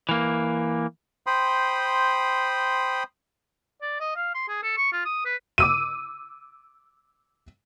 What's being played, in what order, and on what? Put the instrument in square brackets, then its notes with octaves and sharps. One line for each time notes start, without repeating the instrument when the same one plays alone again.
[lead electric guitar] E3 A#3
[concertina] C5 G5 B5 C6 D#6
[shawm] D5
D#5
F5
C6
G#4
A4
C#6
F4
D#6
B4
[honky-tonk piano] D6 E6 D#7